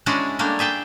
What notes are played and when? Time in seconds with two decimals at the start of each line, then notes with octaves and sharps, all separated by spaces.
0.06 G#3 C#4 D4 E4 F#4 G#4
0.39 G3 A3 A#3 D4
0.59 G#4 E5 G5 A5